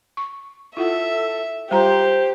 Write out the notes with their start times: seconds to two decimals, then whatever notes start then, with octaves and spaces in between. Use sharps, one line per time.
0.17 C#6
0.77 E4 F4 A4 E5 F#5
1.71 G3 F4 G4 C5 A#5